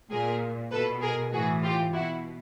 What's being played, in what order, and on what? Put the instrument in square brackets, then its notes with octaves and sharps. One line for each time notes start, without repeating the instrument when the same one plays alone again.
[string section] A#2 G#4 A#4
B2 A4 B4
G#4 A#4
A2 E3 F#4 G#4
F4 G4
B2 E4 F#4